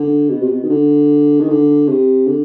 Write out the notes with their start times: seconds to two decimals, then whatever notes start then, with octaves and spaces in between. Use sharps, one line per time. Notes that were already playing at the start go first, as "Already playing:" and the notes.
Already playing: D3
0.30 B2
0.42 C3
0.51 B2
0.63 D#3
0.70 D3
1.40 D#3
1.49 D3
1.89 C3
2.28 D3